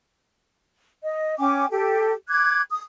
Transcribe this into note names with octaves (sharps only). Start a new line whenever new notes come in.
D#5
C#4 G5 G#5 D6
G4 A4
D6 F#6 G#6
D#6